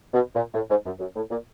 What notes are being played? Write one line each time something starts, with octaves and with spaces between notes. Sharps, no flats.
B2
A#2
A2
G#2
F#2
F#2
A2
A#2